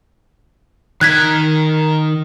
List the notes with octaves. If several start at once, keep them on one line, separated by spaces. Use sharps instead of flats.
D#3 A#4 F#6 G#6 B6